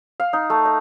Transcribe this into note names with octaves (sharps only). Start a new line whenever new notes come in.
F5
D#4
A3
D#5